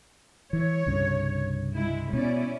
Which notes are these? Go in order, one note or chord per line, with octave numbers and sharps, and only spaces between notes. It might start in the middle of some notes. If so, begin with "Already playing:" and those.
E3 C#5
C2 G2 C#3
G#3 E4
B2 C#4 E4 D5